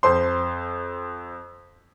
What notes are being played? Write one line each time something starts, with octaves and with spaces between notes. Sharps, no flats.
F2 C5 C6